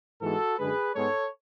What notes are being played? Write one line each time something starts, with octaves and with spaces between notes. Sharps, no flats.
G#2 E3 G#3 B3 F#4 A4
F#2 D3 G#3 G#4 B4
G#2 G#3 B3 A4 C#5